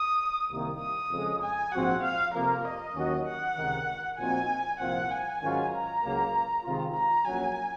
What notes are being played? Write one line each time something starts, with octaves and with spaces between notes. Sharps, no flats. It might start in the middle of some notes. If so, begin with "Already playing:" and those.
Already playing: D#6
C2 C3 D#3 A#3
D#6
F2 C#3 G#3
G#5
A#1 G#2 F3 C4 F#4 F#5
F5
F2 C3 F3 A#3 A#4
D#5
D#2 D#3 F#3 C#4 F#4
F#5
C#2 C3 D#3
A#2 F3 C4 D#4 F#4 G#5
C2 A#2 F3 C4 F4 F#5
G#5
G#2 D#3 F#3 C#4 F4
A#5
C#2 C#3 F#3 A#3
C3 D#3 G#3 C4 F4
A#5
A#1 A#2 F#3 C#4 G#5